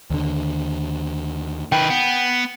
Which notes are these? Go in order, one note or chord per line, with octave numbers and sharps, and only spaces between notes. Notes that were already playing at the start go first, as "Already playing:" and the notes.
D#2 D3
D#3 B4 G5
B3